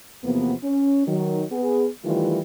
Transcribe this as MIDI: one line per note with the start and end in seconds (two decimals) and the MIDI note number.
0.24 0.53 40
0.24 0.53 48
0.24 0.53 53
0.24 0.53 58
0.24 0.53 59
0.63 1.05 61
1.07 1.44 51
1.07 1.44 54
1.52 1.87 59
1.52 1.87 68
2.04 2.39 51
2.04 2.39 52
2.04 2.39 55
2.04 2.39 57
2.04 2.39 65
2.04 2.39 67